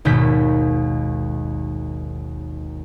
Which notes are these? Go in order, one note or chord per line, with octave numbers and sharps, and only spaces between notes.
G#1 D#2 B2 G6 B6